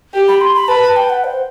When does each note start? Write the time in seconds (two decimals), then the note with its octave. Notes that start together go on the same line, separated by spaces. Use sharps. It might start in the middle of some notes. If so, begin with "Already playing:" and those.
0.14 G4
0.28 B5
0.41 C6
0.55 B5
0.68 B4 A5
0.83 A5
0.96 G5
1.10 F#5
1.24 C5